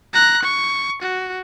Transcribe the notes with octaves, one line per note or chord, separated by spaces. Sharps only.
A#5 F#6
C#6
F#4